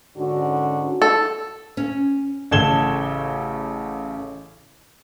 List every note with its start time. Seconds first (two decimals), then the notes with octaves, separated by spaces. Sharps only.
0.17 G#2 D3 C#4 F#4
1.02 A4
1.77 C#4
2.51 A1 C#3 A4 G#6 E7 G7